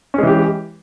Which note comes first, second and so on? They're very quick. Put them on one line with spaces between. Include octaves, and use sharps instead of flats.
C#4 G#3 E3 G4